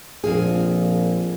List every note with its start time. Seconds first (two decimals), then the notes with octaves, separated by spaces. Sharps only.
0.24 A#1 F2 A#3 G#4